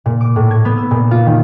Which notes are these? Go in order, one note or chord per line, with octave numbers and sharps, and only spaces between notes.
A#2
D6
A2
G#6
B3
E6
A#2
F4
D#3